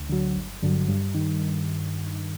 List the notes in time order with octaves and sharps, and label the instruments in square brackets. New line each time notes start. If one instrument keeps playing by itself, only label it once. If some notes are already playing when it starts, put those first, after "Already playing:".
Already playing: [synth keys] D2
D3 F#3
G1
G2 D3 F#3
G2
D#3